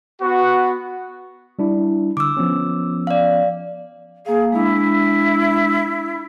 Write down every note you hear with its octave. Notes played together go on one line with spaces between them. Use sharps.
B3 F#4
G3 D4 E4
D3 D6 E6
F3 B3 C#4
D5 F5
A#3 G#4 F5
G#3 D4 E4